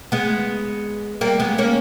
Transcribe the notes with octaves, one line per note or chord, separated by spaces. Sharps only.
G#3 B3
G3 A#3
G#3 B3
A#3 C#4